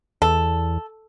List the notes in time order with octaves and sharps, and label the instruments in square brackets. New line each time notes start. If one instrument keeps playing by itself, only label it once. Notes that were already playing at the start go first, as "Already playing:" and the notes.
[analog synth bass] E2 [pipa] A4